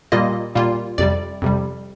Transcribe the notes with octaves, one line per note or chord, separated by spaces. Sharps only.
A#2 G3 A#3 F4 D#5
A#2 G3 A#3 F4
F2 C3 G3 D5
F2 C3 G3